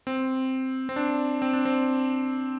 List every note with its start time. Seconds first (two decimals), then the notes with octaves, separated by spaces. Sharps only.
0.07 C4
0.89 C4
0.96 D4
1.42 C4
1.53 D4
1.65 C4